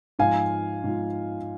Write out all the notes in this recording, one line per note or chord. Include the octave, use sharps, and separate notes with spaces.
G#2 F3 F5 G#5
G#2 F3